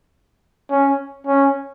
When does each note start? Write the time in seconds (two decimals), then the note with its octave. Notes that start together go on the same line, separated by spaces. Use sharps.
0.71 C#4
1.27 C#4